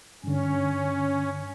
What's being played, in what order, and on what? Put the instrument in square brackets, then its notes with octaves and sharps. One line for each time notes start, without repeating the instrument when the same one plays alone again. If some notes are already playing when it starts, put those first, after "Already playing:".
[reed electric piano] G2 D3 [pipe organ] C#4